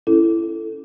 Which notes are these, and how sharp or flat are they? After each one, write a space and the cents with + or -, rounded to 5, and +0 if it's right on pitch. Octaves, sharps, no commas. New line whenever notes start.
C#4 +0 E4 +15 A4 +0